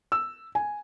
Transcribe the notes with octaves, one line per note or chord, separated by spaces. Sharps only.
E6
G#5